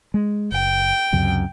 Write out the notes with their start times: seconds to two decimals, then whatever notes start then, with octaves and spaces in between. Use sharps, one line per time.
0.14 G#3
0.52 F#1 G5
1.12 C#2 F#2 C3